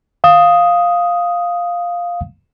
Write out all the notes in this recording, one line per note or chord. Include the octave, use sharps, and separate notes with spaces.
F5 D#6